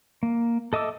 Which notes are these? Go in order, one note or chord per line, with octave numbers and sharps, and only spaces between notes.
A#3
A4 D#5 E5 D6 E6